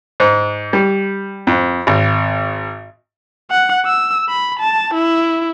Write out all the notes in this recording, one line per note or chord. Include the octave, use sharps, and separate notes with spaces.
G#2
G3
F2
G#1
F#5
E6
B5
A5
E4